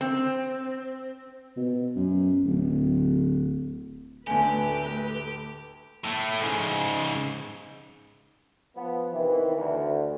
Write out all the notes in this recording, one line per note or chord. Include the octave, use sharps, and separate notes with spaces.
C4
B2
F#2
D1
D2 A2 A3 G4 B4 G#5
A2 A3
G#2 C#3
F3 B3
C3 D#3 E3
D2